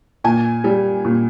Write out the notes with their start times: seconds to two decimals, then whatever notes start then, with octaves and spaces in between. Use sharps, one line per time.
0.24 A#2 G#5
0.64 G3
1.05 A#2